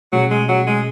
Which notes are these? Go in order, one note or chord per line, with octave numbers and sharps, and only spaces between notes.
B2 F#3 A3 C#4 G#4
G#3
F#3
G#3